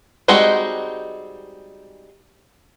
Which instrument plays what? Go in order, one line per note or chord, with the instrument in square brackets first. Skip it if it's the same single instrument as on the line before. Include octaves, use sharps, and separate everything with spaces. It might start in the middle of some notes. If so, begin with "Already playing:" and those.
[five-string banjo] G3 G#3 C4 D#4 F#4